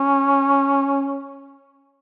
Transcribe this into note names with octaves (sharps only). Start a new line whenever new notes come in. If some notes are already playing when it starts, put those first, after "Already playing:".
Already playing: C#4